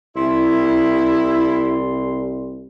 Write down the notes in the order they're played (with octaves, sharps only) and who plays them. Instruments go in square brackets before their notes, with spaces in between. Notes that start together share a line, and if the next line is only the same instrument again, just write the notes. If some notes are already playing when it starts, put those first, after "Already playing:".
[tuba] C2 [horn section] E4 [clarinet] C6